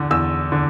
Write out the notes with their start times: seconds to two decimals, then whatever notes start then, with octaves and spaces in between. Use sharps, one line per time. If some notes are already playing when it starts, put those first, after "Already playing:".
Already playing: E2 D3
0.11 E2 E6
0.52 D3